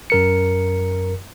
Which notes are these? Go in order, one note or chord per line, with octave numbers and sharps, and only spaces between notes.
F#2 A#4 C#7